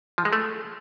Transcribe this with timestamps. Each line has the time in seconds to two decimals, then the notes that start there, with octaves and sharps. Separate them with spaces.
0.18 F3
0.25 G#3
0.33 A3